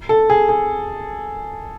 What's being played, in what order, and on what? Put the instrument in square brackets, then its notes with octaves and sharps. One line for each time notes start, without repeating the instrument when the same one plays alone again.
[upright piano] A4
G#4
G#4